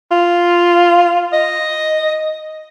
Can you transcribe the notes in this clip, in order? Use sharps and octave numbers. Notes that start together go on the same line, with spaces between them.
F4
D#5